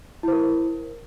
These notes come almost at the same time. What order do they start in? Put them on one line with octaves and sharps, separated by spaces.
E4 C5 A#4